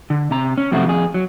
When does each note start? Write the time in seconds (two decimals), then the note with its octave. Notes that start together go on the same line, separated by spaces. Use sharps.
0.10 D3
0.31 C3 A#5
0.58 C#4
0.72 F#2 C3 F3 A3 F#4
0.86 F2 G#4
1.14 F#3